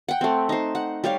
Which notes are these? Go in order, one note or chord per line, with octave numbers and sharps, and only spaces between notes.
F#5 G5
A3 C4
D#4 C5
F#5
G3 G4 C#5 F5